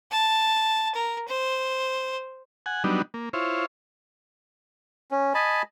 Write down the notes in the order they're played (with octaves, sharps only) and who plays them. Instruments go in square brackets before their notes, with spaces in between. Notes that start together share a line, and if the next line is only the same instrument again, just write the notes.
[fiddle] A5
A#4
C5
[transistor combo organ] F#5 G#5
F#3 G3 B3 D4 D#4
A#3
E4 F4 C5 C#5
[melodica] C#4
D#5 G#5 A5 B5